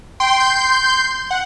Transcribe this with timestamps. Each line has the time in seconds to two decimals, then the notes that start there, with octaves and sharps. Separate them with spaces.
0.20 G5 C6
0.38 C6 G6
1.31 F#5